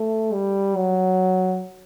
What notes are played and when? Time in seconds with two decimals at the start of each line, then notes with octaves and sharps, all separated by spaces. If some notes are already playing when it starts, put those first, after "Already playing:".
Already playing: A3
0.33 G3
0.77 F#3